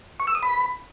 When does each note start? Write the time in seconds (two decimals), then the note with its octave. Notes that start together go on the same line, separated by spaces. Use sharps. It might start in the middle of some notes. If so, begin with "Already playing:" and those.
0.20 C#6
0.27 E6
0.35 D#6
0.43 B5